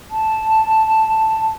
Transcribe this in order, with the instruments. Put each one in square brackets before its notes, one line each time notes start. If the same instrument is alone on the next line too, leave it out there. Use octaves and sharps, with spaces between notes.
[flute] A5